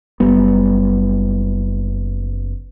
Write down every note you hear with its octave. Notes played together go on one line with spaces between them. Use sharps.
F#1 G3 B3